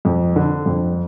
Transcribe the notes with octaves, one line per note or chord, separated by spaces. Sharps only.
F2
D3
F2